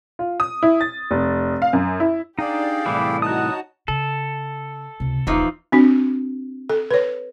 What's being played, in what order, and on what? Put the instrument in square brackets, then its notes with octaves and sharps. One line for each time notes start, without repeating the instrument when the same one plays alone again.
[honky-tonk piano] F4
D#6
E4
A6
F1
F5
F#2
E4
[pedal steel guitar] D4 D#4 [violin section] G4 D5 [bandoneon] G#4 F5 G5
[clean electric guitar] C2 A2 E3 [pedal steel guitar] E4 B5 D6
[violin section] D#4 F#4 C#5 [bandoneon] A5 [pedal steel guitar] D#6 F#6
[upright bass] C#3 [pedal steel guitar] A4
[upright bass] C#2 C3
[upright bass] D#1 A#1 [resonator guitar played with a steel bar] E3 F3 D#4
[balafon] C4 D4 F#4
A4
B4 C#5